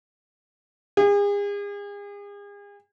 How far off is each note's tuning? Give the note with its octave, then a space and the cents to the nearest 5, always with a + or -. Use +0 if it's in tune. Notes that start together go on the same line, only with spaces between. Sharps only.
G#4 -40